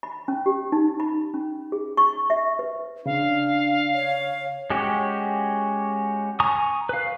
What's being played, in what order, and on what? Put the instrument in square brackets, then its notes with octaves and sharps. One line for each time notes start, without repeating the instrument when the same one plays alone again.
[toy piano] B5
C#4
G4
D#4
B5
C#4
G#4
C#6
E5
B4
[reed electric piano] C#3 [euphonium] D4 [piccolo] F5
[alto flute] C#5
[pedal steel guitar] G#3 C#4 F#4 G4
G#5 A#5 C#6 D#6
B4 F5